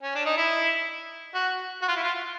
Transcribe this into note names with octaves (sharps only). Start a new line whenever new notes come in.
C#4
D4
D#4
E4
F#4
F#4
F4
E4
F4